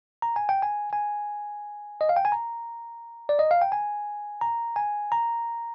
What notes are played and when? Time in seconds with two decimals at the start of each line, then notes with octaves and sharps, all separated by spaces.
0.22 A#5
0.36 G#5
0.49 G5
0.62 G#5
0.93 G#5
2.01 D#5
2.09 F5
2.16 G5
2.25 G#5
2.32 A#5
3.29 D5
3.39 D#5
3.51 F5
3.62 G5
3.72 G#5
4.41 A#5
4.76 G#5
5.12 A#5